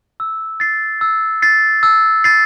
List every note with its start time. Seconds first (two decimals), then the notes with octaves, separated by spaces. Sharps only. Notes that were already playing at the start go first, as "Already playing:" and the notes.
0.20 E6
0.60 A6 C7
1.01 E6
1.42 A6 C7
1.83 E6
2.24 A6 C7